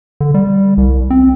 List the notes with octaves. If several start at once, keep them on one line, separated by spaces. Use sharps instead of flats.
D3
G3
C2
C4